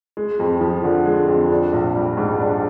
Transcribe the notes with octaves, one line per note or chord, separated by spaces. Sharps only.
G#3
F2
F3
D3
G#3
F2
D4
A#1
G3
G#2
D4